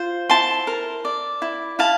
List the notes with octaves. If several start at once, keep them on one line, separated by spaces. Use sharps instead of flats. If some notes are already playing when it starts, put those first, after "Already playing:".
Already playing: F4 C5
E4 A5 C6
A#4
D5
E4
E4 F5 A5